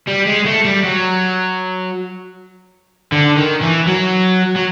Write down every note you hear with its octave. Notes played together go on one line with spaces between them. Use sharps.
G3
G#3
A3
G3
F#3
D3
D#3
E3
F#3
F#3